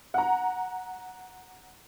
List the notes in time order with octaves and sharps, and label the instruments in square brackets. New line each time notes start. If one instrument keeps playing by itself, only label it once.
[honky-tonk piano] F#5 A#5